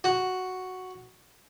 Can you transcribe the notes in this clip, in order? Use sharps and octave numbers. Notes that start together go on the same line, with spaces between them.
F#4